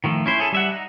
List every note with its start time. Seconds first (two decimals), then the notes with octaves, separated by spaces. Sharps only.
0.04 D#3 F3 A3
0.26 C#4 E4 C5
0.40 G#4 A4
0.52 G3 E5 F#5
0.72 D#4